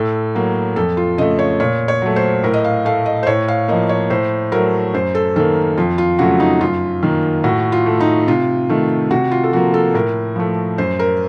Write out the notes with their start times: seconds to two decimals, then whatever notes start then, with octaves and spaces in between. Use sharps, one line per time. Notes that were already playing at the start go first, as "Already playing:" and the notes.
Already playing: A2 A4
0.35 F#3 A#3
0.76 F2 A4
0.97 F4
1.18 C#3 A3 D#5
1.39 C#5
1.60 A#2 C#5
1.88 C#5
2.02 F#3 A3
2.16 C5
2.43 A2 A#4
2.54 D#5
2.64 F5
2.85 A3 F5
3.06 D#5
3.23 C5
3.27 A2 C#5
3.48 F5
3.68 F3 A#3 D#5
3.89 C#5
4.10 A2 C5
4.52 F#3 A3 A#4
4.94 F#2 C5
5.15 A4
5.36 D#3 A#3 A4
5.77 F2 F4
5.98 F4
6.19 C#3 F#3 A3 F#4
6.40 D#4
6.61 F#2 F4
7.03 D#3 A#3
7.44 A2 F#4
7.72 F4
7.86 A3
8.00 D#4
8.27 C3 F4
8.69 D#3 A3
9.11 C3 F#4
9.31 F4
9.44 A4
9.53 F3 A#3 F#4
9.74 A4
9.94 A2 A#4
10.36 F3 A3
10.78 F#2 C5
10.99 A#4